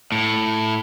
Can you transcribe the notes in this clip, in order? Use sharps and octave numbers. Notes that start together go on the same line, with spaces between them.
A2